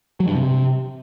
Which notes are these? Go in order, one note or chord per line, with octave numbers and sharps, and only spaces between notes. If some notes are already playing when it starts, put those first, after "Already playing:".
F#3
G2
C3